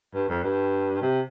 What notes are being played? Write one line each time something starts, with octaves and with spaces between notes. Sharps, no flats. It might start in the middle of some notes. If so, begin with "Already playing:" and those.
G2
F2
G2
C3